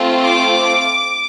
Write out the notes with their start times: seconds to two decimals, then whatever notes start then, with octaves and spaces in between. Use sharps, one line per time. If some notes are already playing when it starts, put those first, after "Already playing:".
Already playing: A3 C4 F4
0.23 D6